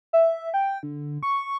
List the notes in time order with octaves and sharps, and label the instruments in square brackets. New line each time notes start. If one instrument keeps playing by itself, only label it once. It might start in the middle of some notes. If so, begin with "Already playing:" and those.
[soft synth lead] E5
G5
D3
C#6